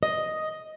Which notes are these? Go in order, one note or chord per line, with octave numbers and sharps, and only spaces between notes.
D#5